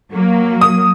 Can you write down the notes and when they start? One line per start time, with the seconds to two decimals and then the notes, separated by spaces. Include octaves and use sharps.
0.11 F#3 A#3
0.61 D#6